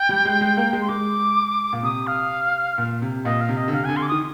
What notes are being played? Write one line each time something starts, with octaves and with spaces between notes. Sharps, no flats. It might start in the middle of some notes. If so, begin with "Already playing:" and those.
Already playing: G5
G3
G#3
G#3
A#3
G#3
C6
G#3 D6
A#2
C3 D#6
F5
A#2
C3
A#2 D#5
F5
C3
D#5
D3
C3 F5
D3 G#5
C6
D6
D#3 D#6